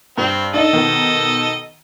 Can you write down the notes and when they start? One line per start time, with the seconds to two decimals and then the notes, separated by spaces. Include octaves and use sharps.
0.18 G2 C4
0.54 D4 D#4 A4 D#5
0.73 B2 D#3